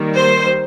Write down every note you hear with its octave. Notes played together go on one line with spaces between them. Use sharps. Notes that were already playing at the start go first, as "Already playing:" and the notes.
Already playing: D#3 G3 A#3
C5